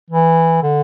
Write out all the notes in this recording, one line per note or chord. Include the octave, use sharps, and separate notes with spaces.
E3
D3